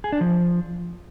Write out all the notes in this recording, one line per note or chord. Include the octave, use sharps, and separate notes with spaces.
G#4
D4
F3